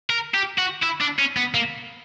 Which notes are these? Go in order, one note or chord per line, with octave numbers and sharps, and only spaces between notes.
A#4
G4
F#4
E4
D4
C#4
B3
A#3